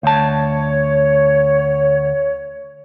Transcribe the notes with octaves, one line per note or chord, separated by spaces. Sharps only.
D2 C#5 A5